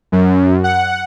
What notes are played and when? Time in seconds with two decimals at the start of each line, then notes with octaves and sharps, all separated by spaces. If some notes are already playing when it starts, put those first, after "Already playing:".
0.12 F#2
0.64 F#5